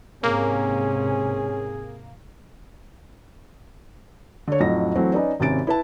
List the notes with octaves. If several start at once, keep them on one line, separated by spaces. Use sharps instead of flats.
G#2 C3 A#3 C#4 G#4
D3 C#5
F2 A2 F#3 D#4 A#6
E3 F#3 A3 C4
C#4 D#4 B4 D5
G#1 C3 C#4 A6 D7
E4 B4 A5